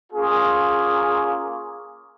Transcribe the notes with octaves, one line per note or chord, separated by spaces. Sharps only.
A#3 C#4 F4 G#4